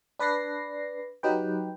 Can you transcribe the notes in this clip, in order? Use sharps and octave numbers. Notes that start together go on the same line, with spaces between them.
D4 B4 D5 A#6 C7
F#3 D#4 G4 B4 G5